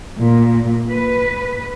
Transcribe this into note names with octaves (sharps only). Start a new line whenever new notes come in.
A#2
B4